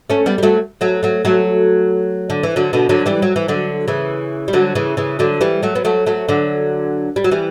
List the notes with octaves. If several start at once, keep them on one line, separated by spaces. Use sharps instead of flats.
A3 C#4
G3 B3
G3
F#3 A3
F#3 A3
F#3 A3
F#3 A3
D3
E3
D3 F#3
B2 D3
D3 F#3
E3 G3
F#3
E3
D3 F#3
C#3 E3
G3
D3 F#3
C#3 E3
C#3 E3
D3 F#3
E3 G3
F#3 A3
B3
F#3 A3
F#3 A3
D3 F#3
G3
F#3
E3 G3